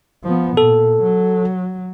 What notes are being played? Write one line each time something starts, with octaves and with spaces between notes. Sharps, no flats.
F3 B3
A#2 A4
F#3